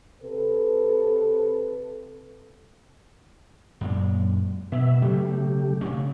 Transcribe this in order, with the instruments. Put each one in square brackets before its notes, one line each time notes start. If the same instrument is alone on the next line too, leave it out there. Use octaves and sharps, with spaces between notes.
[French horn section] C3 A4 B4
[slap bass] F#2 A#2 G#3
[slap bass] B2 [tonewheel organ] B3 E5
[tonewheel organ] C#3 A3 G4 [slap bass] F#3 G3
[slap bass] C#3 C4 C#4